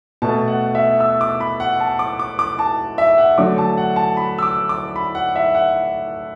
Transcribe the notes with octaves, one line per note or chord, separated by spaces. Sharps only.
B2 A3 A5
F#5
E5
E6
D6
B5
F#5
A5
D6
D6
D6
A5
E5
F#5
D3 F#3 A3 D6
A5
F#5
A5
B5
E6
D6
D6
B5
F#5
E5
F#5